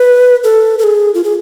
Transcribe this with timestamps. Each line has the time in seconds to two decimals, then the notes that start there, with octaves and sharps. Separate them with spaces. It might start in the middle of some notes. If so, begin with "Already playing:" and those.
Already playing: B4
0.44 A4
0.79 A4
0.83 G#4
1.14 F4
1.24 G#4